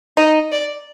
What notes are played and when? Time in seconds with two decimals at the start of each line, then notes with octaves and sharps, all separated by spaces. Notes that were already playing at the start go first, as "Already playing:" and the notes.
0.17 D#4 D#5
0.52 D5